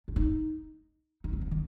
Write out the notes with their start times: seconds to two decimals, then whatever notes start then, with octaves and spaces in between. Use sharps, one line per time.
0.08 D4
0.16 D#4
1.24 D#4
1.33 C4
1.41 F3
1.51 D#3